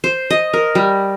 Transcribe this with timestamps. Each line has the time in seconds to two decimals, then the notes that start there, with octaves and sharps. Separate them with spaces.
0.04 C5
0.30 D#5
0.53 A#4
0.75 G3